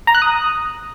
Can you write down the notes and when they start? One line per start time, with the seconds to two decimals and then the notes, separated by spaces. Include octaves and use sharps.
0.07 A#5
0.15 F#6
0.22 D#6